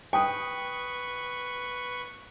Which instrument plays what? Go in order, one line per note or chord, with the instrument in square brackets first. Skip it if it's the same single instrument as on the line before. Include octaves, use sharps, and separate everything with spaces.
[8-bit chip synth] B4 C#6 [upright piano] G5 D#6